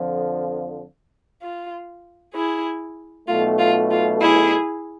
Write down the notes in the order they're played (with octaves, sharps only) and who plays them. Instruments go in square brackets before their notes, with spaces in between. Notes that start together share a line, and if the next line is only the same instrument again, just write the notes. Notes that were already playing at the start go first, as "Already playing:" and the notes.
Already playing: [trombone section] F2 D3 F3
[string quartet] F4
E4 G#4
[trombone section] B1 B2 A3 [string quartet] F4
[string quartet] F4
F4
E4 G#4